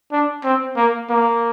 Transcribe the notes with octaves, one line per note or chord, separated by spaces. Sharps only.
D4
C4
A#3
A#3